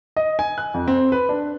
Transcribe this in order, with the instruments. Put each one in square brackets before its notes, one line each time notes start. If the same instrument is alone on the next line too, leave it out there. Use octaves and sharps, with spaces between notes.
[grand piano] D#5
G#5
F#6
F2
C4
B4
D4